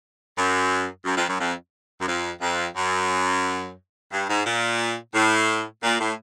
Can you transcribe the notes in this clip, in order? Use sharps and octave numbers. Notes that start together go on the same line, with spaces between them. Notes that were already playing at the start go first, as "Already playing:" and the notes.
F#2
F#2
F2
F#2
F2
F#2
F2
F2
F#2
G2
G#2
A#2
A2
A#2
A2